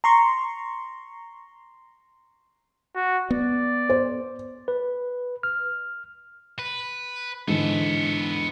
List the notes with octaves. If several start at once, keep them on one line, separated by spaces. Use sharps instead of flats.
A#5 C6 C#6
F#4
B3 D5
C5
B4
F6
B4
G#2 D3 E3 B3 A4